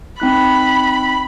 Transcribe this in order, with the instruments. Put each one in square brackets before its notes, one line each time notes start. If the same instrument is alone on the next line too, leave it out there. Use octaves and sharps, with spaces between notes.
[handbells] C4 D#4 F#6 [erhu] B5